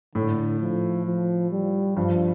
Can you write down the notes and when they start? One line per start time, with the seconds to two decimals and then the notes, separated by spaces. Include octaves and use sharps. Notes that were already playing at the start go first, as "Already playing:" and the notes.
0.15 A2 D3
0.61 F3
1.06 F3
1.51 G3
1.96 G2 F3